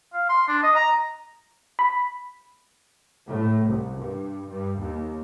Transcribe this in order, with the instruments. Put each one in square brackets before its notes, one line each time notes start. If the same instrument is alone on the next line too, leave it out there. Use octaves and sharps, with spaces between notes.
[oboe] F5
C6
D4
D#5
A#5
[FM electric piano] B5
[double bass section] A2
C2
G2
G2
D#2